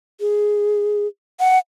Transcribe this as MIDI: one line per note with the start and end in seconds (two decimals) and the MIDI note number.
0.20 1.07 68
1.40 1.59 78